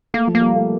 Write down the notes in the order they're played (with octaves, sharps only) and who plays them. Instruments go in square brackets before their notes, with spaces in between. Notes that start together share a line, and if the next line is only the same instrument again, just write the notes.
[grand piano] A3 [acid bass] A#3
[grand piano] F3
[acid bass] A#3
[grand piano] G3
A3